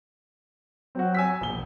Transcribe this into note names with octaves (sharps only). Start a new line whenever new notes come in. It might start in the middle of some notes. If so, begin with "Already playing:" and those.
F#3 C4 F#4
G#5 E6 B6
E1 A#1 G7